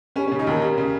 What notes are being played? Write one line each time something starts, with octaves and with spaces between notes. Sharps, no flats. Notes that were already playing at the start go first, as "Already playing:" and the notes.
G3 C#4
C#3 C#4
D#4
D#2 A#4
G3
C#3